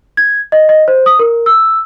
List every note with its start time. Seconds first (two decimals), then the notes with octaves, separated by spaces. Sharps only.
0.17 G#6
0.52 D#5
0.69 D#5
0.88 C5
1.06 D#6
1.19 A#4
1.46 E6